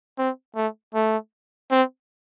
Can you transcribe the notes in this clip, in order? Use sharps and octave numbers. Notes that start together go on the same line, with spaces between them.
C4
A3
A3
C4